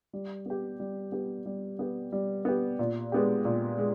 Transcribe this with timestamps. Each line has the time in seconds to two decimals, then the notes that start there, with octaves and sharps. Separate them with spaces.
0.13 G3
0.46 B3 G4
0.80 G3
1.12 B3 G4
1.46 G3
1.79 B3 G4
2.12 G3
2.45 B3 G4
2.79 A#2
3.12 G#3 B3 G4
3.45 A#2
3.78 G#3